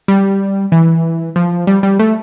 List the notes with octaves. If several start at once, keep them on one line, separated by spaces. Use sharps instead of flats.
G3
E3
F3
G3
G3
A3